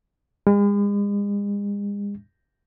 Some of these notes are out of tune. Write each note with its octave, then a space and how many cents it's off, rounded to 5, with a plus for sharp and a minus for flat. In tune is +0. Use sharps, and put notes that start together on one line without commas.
G#3 -40